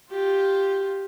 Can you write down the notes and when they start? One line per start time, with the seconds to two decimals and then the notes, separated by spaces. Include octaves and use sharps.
0.12 F4 G4